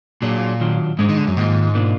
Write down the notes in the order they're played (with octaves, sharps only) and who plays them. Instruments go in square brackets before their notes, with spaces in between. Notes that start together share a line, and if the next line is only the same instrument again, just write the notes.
[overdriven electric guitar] A#2 [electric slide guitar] F#3 D4 G#4
[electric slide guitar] D#3 F#3 D4 F4
[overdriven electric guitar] G#2 [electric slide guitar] G#3 D4 G#4
[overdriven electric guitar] D#3
D3
F#2
[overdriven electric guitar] G#2 [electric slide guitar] D#3 A#3 F4
[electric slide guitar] B2 A#3 D4 F4